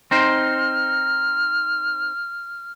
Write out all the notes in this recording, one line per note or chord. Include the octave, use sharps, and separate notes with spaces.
C4 D#4 C5 F6